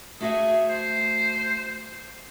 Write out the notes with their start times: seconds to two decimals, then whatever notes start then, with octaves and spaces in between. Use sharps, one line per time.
0.21 A3 F#4 G#4 E5
0.69 C5